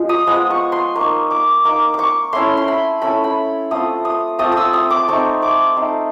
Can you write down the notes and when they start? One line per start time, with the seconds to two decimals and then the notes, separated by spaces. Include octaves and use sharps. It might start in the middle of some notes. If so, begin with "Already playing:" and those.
Already playing: F3 G#3
0.09 D#6
0.27 F3 G#3 B3 D#6
0.50 C#6
0.72 C6
0.95 A#3 D#4 C#6
1.31 D6
1.65 A#3 D#4 D6
1.94 C#6 D6
2.33 A3 C#4 E4 C6
2.57 C6
2.68 B5
3.02 A3 C#4 E4 B5
3.24 B5
3.71 A3 C4 F4 D#6
4.05 D#6
4.39 A3 C4 F4 D#6
4.52 D#6 E6
4.73 D#6
4.90 D6
5.08 A3 C4 D#4 C#6
5.42 D6
5.76 A3 C4 D#4